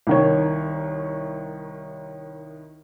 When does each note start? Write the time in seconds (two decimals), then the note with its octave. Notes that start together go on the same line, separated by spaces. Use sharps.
0.07 C2 D#3 C#5